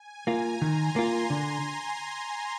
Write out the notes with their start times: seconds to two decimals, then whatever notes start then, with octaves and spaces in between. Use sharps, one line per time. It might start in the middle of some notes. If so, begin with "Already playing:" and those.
Already playing: G#5
0.27 A#3 F4 A#5
0.62 D#3 C6
0.96 A#3 F4
1.30 D3